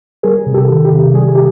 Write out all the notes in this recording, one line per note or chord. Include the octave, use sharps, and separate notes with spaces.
G3 G#4 A#4
C3
G4 A4
D#3
G4
C3
G3 G#4
G4